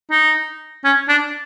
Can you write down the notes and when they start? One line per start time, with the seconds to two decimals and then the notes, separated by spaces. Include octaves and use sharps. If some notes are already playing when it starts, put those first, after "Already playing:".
0.11 D#4
0.84 C#4
1.09 D4